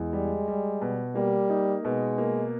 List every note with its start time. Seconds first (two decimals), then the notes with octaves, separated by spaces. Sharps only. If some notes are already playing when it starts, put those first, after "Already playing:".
Already playing: E2 G#3
0.13 G3
0.48 G3
0.81 B2
1.15 G3 A#3
1.50 D#4
1.84 B2 G#3
2.18 A#3